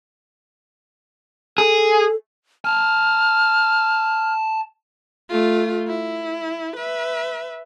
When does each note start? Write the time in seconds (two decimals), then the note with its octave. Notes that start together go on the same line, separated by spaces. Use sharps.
1.58 G#4 A4
2.65 G#5 A5 F6
5.30 A3 F4
5.88 E4
6.77 B4 E5